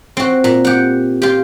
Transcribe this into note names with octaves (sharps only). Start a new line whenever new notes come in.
C4 F#4
A#2
G4 F#5
F4 G4